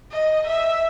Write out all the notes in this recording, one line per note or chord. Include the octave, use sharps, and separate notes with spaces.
D#5
E5